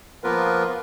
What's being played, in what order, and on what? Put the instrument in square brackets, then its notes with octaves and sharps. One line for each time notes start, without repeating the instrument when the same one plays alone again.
[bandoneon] F3 A#3 B3 F4 A#4 B4